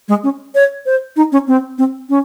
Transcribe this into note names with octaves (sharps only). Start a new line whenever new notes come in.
G#3
C#4
C#5
C5
D#4
C#4
C4
C4
C#4